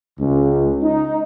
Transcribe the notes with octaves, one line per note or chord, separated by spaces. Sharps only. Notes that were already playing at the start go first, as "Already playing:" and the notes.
C#2
D#4